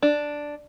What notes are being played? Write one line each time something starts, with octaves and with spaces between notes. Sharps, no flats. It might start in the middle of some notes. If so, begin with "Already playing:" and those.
D4